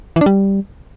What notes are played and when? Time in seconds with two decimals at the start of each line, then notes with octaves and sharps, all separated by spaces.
0.16 E3
0.21 D4
0.26 G3